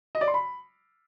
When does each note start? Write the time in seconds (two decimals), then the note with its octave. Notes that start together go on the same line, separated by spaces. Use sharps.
0.15 D#5
0.21 D5
0.28 C6
0.34 B5